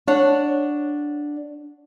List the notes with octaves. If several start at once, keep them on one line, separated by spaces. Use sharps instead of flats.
D4 C#5 F#5